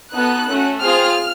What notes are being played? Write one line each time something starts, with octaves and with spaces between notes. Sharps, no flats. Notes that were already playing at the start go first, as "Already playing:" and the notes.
B3 D#4 F#4 A4 F#6
A3 C#4 F#4
C4 F4 G#4 F6